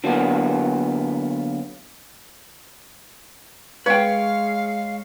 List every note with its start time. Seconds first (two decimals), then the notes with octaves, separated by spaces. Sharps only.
0.04 D3 F#3 A#3 B3
3.86 G#3 B4 C#5 F5 G5